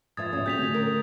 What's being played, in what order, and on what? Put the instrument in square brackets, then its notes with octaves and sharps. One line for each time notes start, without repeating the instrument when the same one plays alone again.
[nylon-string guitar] G#2 F3 E5 [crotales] D#6 G#6 A6
[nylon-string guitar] D2 A#2 C#4
[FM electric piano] C4 F#4 G5 [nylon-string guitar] G#4 [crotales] G6 B6 F7
[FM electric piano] D3 A3
[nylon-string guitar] A#4 [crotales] D#6